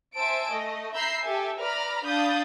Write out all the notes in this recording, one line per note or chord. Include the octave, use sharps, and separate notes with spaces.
C5 E5 G#5 A5 E6 D7
A3 D#5
E5 A#5 B5 E6 G6 C7
G4 A4 E5 G#5
B4 D5 A#5 B5 F6
D4 F5 B5 D#6 G6 A6